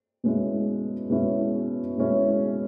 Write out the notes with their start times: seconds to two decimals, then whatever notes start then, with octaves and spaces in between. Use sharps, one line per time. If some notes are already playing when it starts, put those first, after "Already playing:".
0.24 B2 G#3 C#4 E4
1.10 B2 G#3 C#4 E4
1.98 B2 G#3 C#4 E4